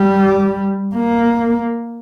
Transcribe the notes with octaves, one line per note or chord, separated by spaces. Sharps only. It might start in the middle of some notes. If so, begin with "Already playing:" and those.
Already playing: G3
A#3